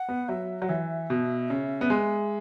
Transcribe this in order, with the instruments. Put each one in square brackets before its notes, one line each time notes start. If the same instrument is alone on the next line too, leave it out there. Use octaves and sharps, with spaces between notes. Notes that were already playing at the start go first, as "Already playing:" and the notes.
Already playing: [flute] F#5
[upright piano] B3
[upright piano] F#3 [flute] E5
[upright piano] F#3 [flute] F#5
[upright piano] E3 [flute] E5
[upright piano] B2
C#3
B3
G#3